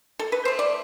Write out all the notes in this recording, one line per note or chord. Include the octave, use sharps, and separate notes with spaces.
A4
B4
A3 C5
D5